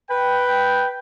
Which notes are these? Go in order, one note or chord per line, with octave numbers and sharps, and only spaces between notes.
B4 G5